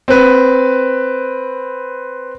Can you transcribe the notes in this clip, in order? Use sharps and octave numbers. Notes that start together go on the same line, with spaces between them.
C4 B4